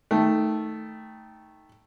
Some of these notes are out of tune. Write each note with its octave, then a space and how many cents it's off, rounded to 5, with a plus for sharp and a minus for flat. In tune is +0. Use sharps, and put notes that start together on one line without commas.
D#3 +15 A3 +0